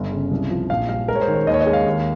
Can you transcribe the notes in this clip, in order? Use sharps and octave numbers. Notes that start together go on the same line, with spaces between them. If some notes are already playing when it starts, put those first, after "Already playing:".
Already playing: G1
C#3
C2
F3
A#1 F5
G3 F5
G#3 A#4
C#5
C5
D#3
C#5
D#2 D#5
C#5
D#5
G#3
F5
D#2